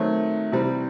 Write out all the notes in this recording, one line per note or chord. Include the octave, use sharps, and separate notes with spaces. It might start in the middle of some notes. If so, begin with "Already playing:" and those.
Already playing: D#3 F#3 A3 C4
C3 E3 G3 C4